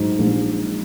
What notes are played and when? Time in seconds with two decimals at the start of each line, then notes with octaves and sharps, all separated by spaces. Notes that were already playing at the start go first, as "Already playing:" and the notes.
Already playing: G#2 F#3
0.19 A#1